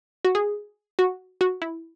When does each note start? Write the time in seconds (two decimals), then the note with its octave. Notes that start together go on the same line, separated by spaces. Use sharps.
0.25 F#4
0.35 G#4
0.99 F#4
1.41 F#4
1.62 E4